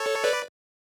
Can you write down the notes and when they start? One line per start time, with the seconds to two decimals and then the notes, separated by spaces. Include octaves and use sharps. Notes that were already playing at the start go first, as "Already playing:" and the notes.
Already playing: A4 C#5
0.24 B4 D5